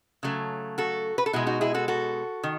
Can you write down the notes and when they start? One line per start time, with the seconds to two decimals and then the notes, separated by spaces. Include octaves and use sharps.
0.23 C#3 F#3 A3
0.78 F#4 A4
1.18 B4
1.26 A4
1.33 B2 G#3 E4 G#4
1.46 D#4 F#4
1.61 E4 G#4
1.74 F#4 A4
1.88 F#4 A4
2.44 D#3